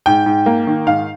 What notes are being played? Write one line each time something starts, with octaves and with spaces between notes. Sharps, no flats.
G#2 G5
G#2
A#3
D#3
G#2 F5